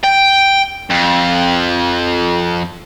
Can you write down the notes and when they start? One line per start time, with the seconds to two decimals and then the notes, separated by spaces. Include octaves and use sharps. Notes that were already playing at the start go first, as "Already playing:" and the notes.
0.03 G5
0.90 F2